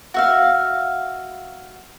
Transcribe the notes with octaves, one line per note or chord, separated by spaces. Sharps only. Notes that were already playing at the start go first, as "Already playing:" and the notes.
F#4 E5 F5